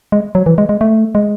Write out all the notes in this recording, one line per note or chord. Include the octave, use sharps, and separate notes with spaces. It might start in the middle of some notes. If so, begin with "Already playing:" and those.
G#3
F#3
E3
G#3
G#3
A3
G#3